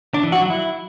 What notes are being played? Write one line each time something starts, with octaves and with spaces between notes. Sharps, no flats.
D4
E3
F#4
F#3
E4